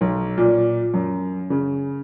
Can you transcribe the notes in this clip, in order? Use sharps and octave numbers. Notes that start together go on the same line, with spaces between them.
B1
A#2
F#2
C#3